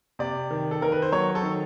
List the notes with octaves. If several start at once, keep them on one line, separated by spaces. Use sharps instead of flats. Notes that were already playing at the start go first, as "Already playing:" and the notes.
C3 D5
D#3
A4
D#3 A#4
B4
C5
F#3 C#5
A4
D#3